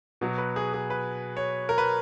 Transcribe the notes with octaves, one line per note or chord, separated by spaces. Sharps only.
B2 F#3
B4
G#4
G#4
B4
C#5
A#4
B4